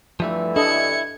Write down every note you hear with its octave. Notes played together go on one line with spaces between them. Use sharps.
G2 D3 E3 F3 G3 A3
D4 E4 A4 D#5 G#6 C#7